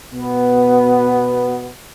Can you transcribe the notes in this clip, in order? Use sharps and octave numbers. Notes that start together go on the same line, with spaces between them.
B2 B3